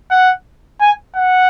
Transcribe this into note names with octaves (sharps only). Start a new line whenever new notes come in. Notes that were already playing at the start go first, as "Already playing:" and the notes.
F#5
G#5
F#5